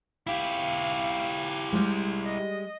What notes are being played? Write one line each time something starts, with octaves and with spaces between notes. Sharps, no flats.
E4 G4 F5
G3 G#3
D#5